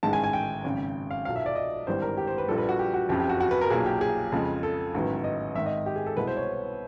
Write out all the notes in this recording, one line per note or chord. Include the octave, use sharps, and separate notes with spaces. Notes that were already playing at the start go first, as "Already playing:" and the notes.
A1 G#2 D#3 G#3 A5
G#5
G#5
G5
G#1 F#2 C#3
F5
B1 A#2 F#3 F5
E5
D5
D#5
G#1 G2 E3 G3 C5
A#4
G4
C5
B4
A#1 A#2 G3 A4
B4
F#4
G4
F#4
F#1 F2 C#3 G4
G4
F#4
F#4
B4
A#4
B1 A#2 F#3 A#3 G#4
G4
G#4
F2 C#3 F3 G#3
A4
A1 G#2 D#3 F#3 B3
D#5
G#1 G#2 D#3 E5
D#5
G4
G#4
A4
C2 B2 G#3 B3 E4 B4
C5
C#5